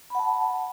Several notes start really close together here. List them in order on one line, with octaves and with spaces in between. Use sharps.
B5 F#5 A5